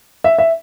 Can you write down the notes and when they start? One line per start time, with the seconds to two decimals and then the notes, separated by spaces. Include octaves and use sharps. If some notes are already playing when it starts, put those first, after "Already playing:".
0.24 E5
0.38 E5